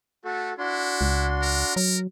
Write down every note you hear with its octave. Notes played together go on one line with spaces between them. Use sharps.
A3 F#4 A4
D4 E4 F#4 C6
C#2
A#4
F#3 A#4